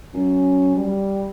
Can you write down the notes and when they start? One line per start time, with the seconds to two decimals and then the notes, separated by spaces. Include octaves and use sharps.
0.14 F#2 C#4
0.76 G3